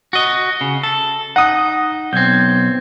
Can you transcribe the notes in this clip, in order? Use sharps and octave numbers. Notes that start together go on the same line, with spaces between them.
F#4 D#5
C#3
A4
D#4 F#5 D#6
B1 C4 G6 G#6